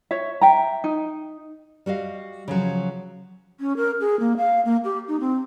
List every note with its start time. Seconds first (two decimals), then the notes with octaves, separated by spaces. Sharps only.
0.11 C#5 E5
0.41 E5 G5 A#5
0.84 D#4
1.86 G3 F#4 D#5 F5
2.48 C#3 F3 F#3
3.60 C#4
3.77 A#4
4.00 G#4
4.20 A#3
4.37 F5
4.65 A#3
4.84 G4
5.08 D#4
5.20 C4